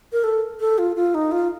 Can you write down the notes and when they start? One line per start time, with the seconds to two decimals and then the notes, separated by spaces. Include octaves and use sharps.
0.13 A#4
0.24 A4
0.60 A4
0.78 F4
0.96 F4
1.15 D#4
1.32 F4